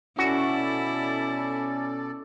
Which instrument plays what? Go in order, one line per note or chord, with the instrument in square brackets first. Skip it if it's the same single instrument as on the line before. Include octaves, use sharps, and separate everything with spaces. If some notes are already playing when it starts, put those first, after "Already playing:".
[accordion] B2 A4 D5 [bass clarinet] C#4 [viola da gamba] E4 [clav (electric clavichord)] F#4